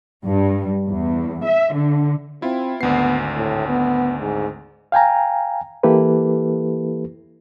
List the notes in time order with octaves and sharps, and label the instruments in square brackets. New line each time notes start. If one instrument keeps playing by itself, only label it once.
[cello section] G2
E2
E5
D3
[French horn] C4 [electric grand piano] E4 F4
[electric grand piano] G#1 D2 C7 [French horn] B3
[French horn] A2
B3
G#2
[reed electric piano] F5 G5 G#5 A#5
E3 A#3 E4 G4 A4 B4